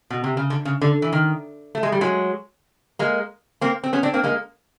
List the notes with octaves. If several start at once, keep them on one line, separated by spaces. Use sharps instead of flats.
B2
C3
C#3
D3
C#3
D3
E3
D#3
A3
G#3
G3
F#3 G#3
G#3 A#3
A#3 C4
C4
B3 C#4
C4 D4
A#3 C4
G#3 A#3